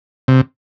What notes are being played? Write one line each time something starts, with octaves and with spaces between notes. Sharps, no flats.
C3